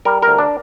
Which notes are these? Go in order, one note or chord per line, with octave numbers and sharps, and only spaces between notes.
G3 A#4
A#4
D2
D4